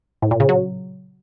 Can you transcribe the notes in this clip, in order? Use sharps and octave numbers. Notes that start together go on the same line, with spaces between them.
A2
A#2
C#3
F#3